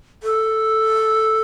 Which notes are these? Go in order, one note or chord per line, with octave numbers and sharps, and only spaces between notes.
A4